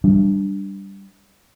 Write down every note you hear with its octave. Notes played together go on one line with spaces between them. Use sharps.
G3 D4